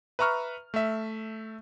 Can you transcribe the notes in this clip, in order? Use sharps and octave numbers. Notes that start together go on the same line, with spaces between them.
B4 E5 A#5 C#6 F6
A3 E5